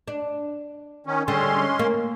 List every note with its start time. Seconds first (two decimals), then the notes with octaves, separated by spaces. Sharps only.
0.08 D4
1.07 D#3 C#4
1.28 D3 G3 G#3 C#4 C6
1.79 A#3